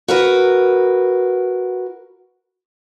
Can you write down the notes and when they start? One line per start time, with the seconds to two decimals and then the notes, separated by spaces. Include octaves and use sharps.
0.08 F#4 A#4 B4